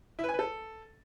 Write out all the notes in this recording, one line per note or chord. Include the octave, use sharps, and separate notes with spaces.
E4
B4
G#5
B4
A4